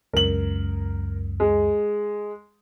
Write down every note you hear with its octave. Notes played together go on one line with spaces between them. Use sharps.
C#2 F#2 A#4 F#7
G#3